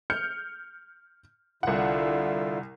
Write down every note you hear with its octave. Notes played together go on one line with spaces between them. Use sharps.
F6 G6 C#7
C2 D3 E4 F4 F#5